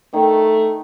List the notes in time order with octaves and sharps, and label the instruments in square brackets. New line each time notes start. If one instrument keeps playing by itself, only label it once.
[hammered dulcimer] D#3 [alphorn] A3